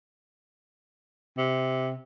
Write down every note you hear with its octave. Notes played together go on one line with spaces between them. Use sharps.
C3